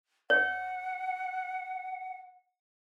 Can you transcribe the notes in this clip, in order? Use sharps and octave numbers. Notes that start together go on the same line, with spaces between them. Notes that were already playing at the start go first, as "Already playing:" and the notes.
C#5 F#5